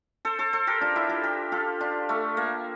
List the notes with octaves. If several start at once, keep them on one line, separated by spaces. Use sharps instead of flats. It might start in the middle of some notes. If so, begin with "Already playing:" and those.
A4 C5
A4 C5
A4 C5
G4 A#4
D4 F4
E4 G4
F4 A4
G4 A#4
F4 A4
D4 F4
A3
A#3